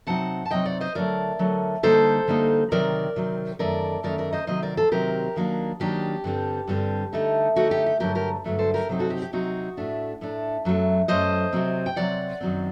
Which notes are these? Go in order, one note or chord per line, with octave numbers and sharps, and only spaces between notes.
C3 F#3 C4 D#4 F#5 A5
A5
C3 F#3 C4 D#4 D#5 G5
D5 F#5
C5 D#5
D3 F#3 A3 A#4 D5
D3 F#3 A3
D3 G3 A#3 D#4 A4 C5
D3 G3 A#3 D#4
C3 D#3 F#3 C4 A#4 D5
C3 D#3 F#3 C4
F#2 D#3 A3 A#4 D5
F#2 D#3 A3 A#4 D5
A#4 D5
C5 D#5
C3 D#3 F#3 C4 C5 D#5
A#4 D5
A4 C5
C3 D#3 F#3 C4 G4 A#4
D#3 F#3 A#3 D4
D#3 F#3 A#3 D4 G4
G2 D3 G3 C4
G2 D3 G3 C4
D3 A3 D#4
D3 A3 D#4 F#4
G4
G4
G2 D3 F#3 A3 D4 G4 A#4
G4 A#4
G2 D3 F#3 A3 D4
A4 C5
G4 A#4
C3 F#3 C4 D#4
F#4 A4
G4
G4
C3 F#3 C4 D#4 F#4
A2 A3 D4
A2 A3 D4
F#2 F#3 A3
F#2 F#3 A3 C5 D#5
C3 F#3 C4
G5
C3 F#3 C4 D5 F#5
F#2 D#3 F#3 C4